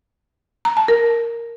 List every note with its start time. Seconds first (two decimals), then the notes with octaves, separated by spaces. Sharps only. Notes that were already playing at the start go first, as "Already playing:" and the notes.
0.65 A#5
0.77 A5
0.88 A#4